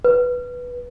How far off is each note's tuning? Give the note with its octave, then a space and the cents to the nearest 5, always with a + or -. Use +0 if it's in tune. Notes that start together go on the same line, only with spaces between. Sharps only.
B4 -5